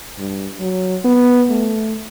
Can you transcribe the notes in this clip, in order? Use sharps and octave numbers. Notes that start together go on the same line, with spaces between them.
G2
F#3
B3
A3